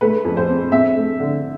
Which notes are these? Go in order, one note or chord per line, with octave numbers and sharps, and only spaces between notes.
A3 B4
F2
C5
C4
C4 E5
A3
D3